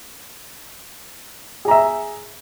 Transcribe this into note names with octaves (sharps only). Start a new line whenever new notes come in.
G#4 E5 A#5